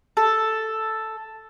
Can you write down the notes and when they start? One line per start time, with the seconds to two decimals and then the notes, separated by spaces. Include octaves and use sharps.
0.17 A4